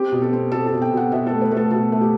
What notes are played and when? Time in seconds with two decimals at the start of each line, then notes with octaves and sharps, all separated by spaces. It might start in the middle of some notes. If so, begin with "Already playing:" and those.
Already playing: C4 G4
0.12 B2
0.22 A4
0.33 C4
0.52 B2 A4
0.66 A4
0.72 B2
0.82 G5
0.92 B2 F#5
1.12 B2 E5
1.27 A3 A4
1.41 B4
1.52 A3
1.57 A4
1.71 B2 A4
1.92 A3
2.01 G4